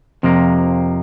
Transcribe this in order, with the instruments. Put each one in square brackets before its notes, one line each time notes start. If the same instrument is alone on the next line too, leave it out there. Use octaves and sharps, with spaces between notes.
[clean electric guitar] F2 C3 F3 A#3